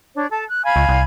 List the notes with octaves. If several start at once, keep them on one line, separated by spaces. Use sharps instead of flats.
D4 C#5
A4 A5
F#6
F5 G#5 B5
C#2
C2